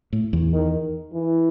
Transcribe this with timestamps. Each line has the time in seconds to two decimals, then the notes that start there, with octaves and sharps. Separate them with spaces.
0.13 A2
0.33 E2
0.53 D#3
1.13 E3